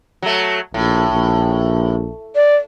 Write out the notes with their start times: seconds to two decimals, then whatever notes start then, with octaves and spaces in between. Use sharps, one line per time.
0.22 F#3 A3
0.74 A#1 A2
1.12 A#1
2.35 D5